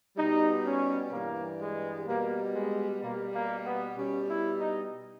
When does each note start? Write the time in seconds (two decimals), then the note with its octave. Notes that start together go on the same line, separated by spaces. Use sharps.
0.16 B2 G3 D#4
0.64 C#4
1.11 G2 E3 G3 A#3
1.59 G#3
2.06 B2 G3 A#3
2.53 G#3
3.01 B2 G3 A#3
3.33 A#3
3.64 B3
3.96 B2 G3 C#4
4.28 E4
4.59 D#4